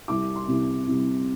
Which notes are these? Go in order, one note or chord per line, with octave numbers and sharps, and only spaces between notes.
C2 C3 G3 D6
C6
C2 C3 G3
C2 C3 G3